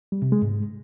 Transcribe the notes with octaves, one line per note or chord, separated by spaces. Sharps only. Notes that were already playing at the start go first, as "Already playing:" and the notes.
G3
C3
G#3
G#2